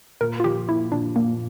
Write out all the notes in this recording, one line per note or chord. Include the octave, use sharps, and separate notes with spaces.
A#2 A#4
F4
F3 G4
A#3 E4
A#2 D4
A#2 A#3